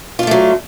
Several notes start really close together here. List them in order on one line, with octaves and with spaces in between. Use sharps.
F4 D4 A3 F#3